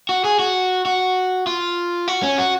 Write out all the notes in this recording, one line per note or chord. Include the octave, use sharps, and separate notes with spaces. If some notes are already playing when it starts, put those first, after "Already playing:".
F#4
G#4
F#4
F#4
F4
F#4
C#4
F#4